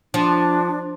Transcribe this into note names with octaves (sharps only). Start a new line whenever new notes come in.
F3 D4